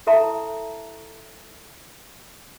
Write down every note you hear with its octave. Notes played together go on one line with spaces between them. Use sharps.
E4 A4 E5 A5 A#5